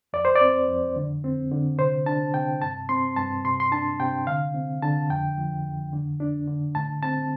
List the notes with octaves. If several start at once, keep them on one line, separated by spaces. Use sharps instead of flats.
F2 D5
C5
D5
C4
F2
D3
C4
D3
C3 C5
D4 A5
C3 G5
G2 A5
C4 C6
G2 A5
C3 C6
C6
D4 A5
C3 G5
D3 F5
C4
D3 A5
F2 G5
F3
F2
D3
D4
D3
A2 A5
C4 A5